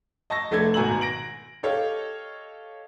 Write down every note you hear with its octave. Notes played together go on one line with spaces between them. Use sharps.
D#5 A5 C#6 E6 A#6
F1 A3 D4 A4 D5 G#6
G#1 B2 G#5 A#5 E6 F#7
A#6 D7 F#7
G4 A4 C#5 D#5 F5